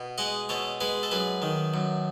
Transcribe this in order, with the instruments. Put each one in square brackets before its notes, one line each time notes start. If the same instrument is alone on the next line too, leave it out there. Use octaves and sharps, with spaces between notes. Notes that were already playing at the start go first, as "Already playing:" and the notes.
Already playing: [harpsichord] B2
G#3 D#5 F#5
B2 A4 C#5
G#3 G#4 B4
A4
F#2 G#4 B4
D#3
F#2